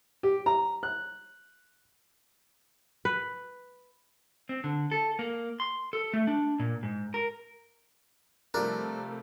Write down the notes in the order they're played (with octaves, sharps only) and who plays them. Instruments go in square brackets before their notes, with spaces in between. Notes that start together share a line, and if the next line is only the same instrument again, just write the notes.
[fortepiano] G4
A#5
F#6
[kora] B4
[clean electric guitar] C4
D3
A4
A#3
C6
A4
A3
D4
A#2
G#2
A#4
[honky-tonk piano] C3 F3 G3 [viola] A3 [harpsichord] D4 [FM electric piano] A#4